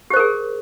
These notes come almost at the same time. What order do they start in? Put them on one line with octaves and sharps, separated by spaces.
G4 C5 A#4 G#4